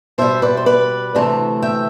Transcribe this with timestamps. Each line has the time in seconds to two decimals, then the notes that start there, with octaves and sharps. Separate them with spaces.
0.18 B2 G3 C5 E5
0.42 B4 D5
0.57 C5
0.66 B4 D5
1.15 D2 C3 E3 A3
1.62 E5 G5